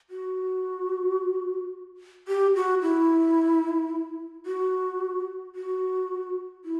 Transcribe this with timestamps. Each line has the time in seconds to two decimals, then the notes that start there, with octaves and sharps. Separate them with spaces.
0.10 F#4
2.28 G4
2.55 F#4
2.82 E4
4.46 F#4
5.55 F#4
6.65 E4